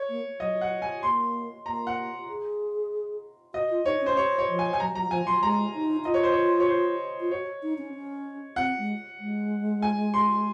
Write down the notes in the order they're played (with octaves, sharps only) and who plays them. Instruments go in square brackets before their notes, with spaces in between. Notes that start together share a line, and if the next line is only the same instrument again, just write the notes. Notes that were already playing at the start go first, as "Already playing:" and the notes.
Already playing: [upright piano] C#5
[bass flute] A#3
[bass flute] F#3 [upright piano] D#5
[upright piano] F#5
G#5
[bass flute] A#3 [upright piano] C6
[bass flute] A#3 [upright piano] A#5
[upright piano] F#5
[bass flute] G#4
[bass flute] F#4 [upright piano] D#5
[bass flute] F4
[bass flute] D#4 [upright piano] C#5
[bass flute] C#4
[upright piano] C5
C#5
C#5
[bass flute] F3
[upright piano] G#5
G#5
[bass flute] F#3 [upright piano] A#5
[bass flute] F#3 [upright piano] A#5
[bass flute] F3 [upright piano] G#5
[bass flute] F#3 [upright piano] C6
[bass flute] G#3 [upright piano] A#5
[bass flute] D#4
[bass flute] F4 [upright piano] D#5
[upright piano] C#5
C5
C#5
C#5
C5
[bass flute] F4
[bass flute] F#4 [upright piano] C#5
[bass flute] D#4
C#4
C#4
[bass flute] C4 [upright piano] F#5
[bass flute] G#3
G#3
[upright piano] G#5
C6